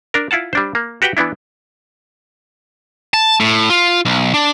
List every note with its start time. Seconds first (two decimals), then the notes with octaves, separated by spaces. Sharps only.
0.14 D4 A#4
0.31 E4 F4 F#5 A5
0.53 G3 D4 C5
0.75 A#3
1.02 F#4 G4 B4 F#5 G5
1.17 E3 B3 D4 E4
3.14 A5
3.40 A2
3.70 F4
4.05 B1
4.34 D4